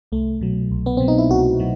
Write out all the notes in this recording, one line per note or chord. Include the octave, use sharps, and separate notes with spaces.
C2 A3
B2 F#3
C2
B3
B2 F#3 C4
D#4
E4
C2 F#4
B2 F#3